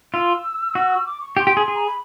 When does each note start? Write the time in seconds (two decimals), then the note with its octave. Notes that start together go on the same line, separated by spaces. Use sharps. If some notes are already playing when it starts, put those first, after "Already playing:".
0.13 F4 E6
0.75 F#4
1.06 D6
1.21 C#6
1.37 G4 C#6
1.40 C6
1.47 G4
1.57 G#4
1.68 G#4
1.76 A#5
1.86 B5